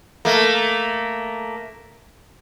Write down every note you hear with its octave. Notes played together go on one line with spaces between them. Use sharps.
A3 A#3